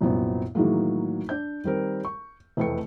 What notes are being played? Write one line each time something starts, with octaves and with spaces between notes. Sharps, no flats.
C2 F#2 A#2 B3 C4
A2 D#3 E3 F#3 G#3 A#3
D4 D5 G6
D#3 G3 C4 A#4
C#6
F1 E2 A3 B4 G5 C#7